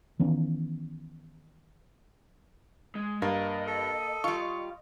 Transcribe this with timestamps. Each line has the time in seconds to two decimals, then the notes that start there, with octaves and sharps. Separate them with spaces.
0.19 D#3 E3 B3 C#4
2.95 G#3
3.22 G2 A#3 D#5
3.67 A4
4.24 G3 F4 C#6